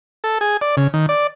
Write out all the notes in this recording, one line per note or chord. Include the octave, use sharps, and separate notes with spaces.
A4
G#4
D5
C#3
D#3
D5